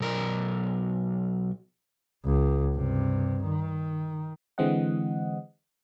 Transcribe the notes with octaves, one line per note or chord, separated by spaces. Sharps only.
B1 A#4
C#2
G2 C3
D#3
D3 E3 G#3 C4 D#5 F#5